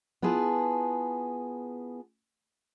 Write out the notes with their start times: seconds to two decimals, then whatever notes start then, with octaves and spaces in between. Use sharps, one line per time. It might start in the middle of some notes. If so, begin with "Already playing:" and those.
0.22 B3 E4 F4 G#4 B4 A5